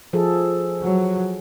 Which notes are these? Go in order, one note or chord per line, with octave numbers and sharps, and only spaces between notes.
F3 G#4 A4
F#3